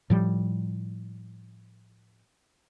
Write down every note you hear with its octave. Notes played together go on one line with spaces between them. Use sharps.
A2 F3 G3